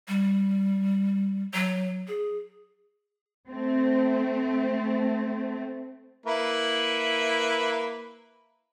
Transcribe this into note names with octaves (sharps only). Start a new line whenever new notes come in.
G3
F#3
G#4
A3 C4
A#3 E4 B4